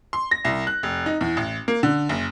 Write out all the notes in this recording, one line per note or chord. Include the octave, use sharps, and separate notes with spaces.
C6
A#6
C2
F#6
F1
D#4
E2
A1
A#3
D3
F#1